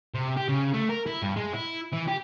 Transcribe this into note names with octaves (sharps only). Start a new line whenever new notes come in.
C3
G4
C#3
A3
A#4
E4
G2
G#3
E4
E3
G4